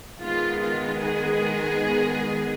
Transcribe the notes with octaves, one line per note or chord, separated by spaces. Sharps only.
D#3 G#3 B3 F4
F4
G#4